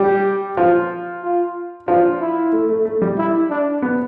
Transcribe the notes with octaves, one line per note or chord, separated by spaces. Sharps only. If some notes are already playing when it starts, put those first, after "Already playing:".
Already playing: G3 G4
F3
F4
F3 D4
E4
A3
A3
A3
G3
E4
D4
B3